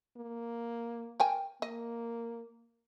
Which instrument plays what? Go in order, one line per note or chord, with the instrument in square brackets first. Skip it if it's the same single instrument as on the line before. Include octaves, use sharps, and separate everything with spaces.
[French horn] A#3
[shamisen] A#4 G5 G#5
[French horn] A#3 [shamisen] D#5